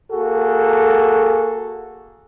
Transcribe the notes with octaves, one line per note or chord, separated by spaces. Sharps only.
A#3 F#4 G#4 A4